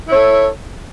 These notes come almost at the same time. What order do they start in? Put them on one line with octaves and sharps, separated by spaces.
E4 C#5 A4